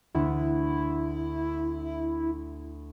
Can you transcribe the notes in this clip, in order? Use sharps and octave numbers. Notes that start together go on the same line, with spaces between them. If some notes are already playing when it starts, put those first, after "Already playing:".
D2 E4 E5 F#5